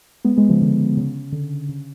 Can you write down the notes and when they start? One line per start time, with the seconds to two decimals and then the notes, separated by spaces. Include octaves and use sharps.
0.25 G#3 B3
0.37 G#3 B3
0.49 C#3 F3
0.62 D3
0.97 C#3
1.32 D3
1.69 C#3